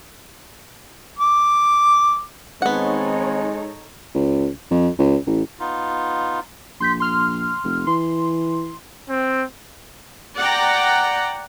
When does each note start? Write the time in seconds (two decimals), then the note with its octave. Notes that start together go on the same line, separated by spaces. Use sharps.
1.19 D6
2.62 D#3 G#3 B3 C4 D#4 A4 C#5 F#5
4.14 C#2
4.71 F2
4.99 C#2
5.27 A1
5.60 B3 D#4 F4
6.80 A#1 C6 G6 B6
7.00 C6 F6
7.64 F1
7.87 E3 C6
9.09 C4
10.37 D5 F#5 G5 A#5